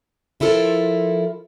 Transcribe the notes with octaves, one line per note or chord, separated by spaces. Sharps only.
F3 E4 F4 A4 A#4